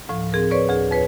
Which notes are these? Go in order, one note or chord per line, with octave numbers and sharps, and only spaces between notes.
D2 A2 F3
C4 G#4 A#4
B4 C#5 D5 C#6
D2 G#4
F2 B4 C#5